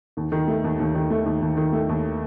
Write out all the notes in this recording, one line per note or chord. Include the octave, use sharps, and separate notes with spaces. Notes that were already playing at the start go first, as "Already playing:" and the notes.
D#2
D#3
A3
D#2
D#2
D#3
A3
D#2
D#2
D#3
A3
D#2